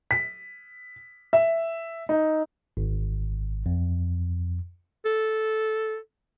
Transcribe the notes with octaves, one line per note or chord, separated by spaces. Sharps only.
B6
E5
D#4
G#1
F2
A4